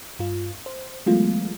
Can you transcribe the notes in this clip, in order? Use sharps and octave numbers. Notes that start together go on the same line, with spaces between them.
G2 F4
C5
E3 F#3 G#3 A3 B3 F4